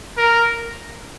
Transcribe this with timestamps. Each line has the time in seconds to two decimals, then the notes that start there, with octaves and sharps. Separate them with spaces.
0.17 A#4